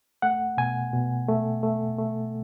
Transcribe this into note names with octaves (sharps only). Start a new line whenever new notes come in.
A3 F#5
B2 G#5
B2
A3
A3
A3